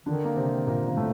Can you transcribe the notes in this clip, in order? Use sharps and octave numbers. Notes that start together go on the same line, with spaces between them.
D3 D#3 D4
A#3
C3 C4
A#2 A#3
A#3
A2 A3